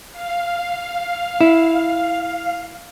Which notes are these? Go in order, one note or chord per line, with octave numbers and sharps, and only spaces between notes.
F5
E4